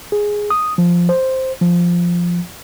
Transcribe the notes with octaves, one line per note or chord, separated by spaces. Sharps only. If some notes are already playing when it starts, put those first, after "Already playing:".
G#4
D#6
F3
C5
F3